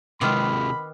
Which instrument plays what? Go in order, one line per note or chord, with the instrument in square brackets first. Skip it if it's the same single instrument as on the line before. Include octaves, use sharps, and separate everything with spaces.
[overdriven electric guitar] C3 G#3 [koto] D#3 B3 C4 [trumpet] B5 [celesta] D6 F6